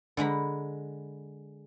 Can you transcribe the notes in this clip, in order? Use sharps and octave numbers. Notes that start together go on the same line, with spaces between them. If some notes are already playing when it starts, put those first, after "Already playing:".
D3 G#3 A#5 B5